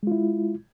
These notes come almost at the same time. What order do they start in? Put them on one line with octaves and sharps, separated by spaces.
G#3 F4 E4